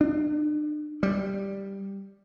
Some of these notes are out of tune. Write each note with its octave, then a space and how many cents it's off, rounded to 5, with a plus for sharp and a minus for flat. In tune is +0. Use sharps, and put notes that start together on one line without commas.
D4 +40
G3 +5